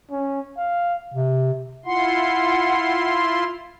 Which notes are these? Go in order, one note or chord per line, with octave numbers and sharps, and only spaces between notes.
C#4
F5
C3
E4 F4 F#5 C6